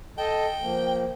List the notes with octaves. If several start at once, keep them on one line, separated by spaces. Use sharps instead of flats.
A4 D#5 G5 A5
F3 A#3